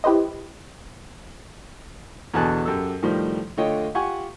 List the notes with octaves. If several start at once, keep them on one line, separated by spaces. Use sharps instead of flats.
E4 G4 B4 C5 D#5
E2 B2 D3 G#5 A5 F#6
F#2 G4 A4 E6
A2 D#3 F3 G3
D3 A3 F4 C#5 D#5 G5
F4 G4 F#5 G#5 C#6